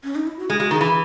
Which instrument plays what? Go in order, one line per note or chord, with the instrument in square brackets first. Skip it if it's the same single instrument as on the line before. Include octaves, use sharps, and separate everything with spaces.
[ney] C#4
D#4
E4
F#4
[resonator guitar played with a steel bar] G#3 [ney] G#4
[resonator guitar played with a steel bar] G#3 [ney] F#4
[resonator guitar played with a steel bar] D#3 [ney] G#4
[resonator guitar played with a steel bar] E3